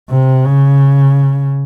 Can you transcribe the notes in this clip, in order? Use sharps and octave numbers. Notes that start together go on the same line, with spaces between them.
C3
C#3